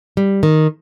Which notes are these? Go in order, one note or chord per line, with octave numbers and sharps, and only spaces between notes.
G3
D#3